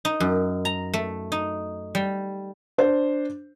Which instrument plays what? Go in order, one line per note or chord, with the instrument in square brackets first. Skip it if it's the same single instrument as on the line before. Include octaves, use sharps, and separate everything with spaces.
[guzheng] D#4
F#2
A#5
A3
D#4
G3
[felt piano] D4 C5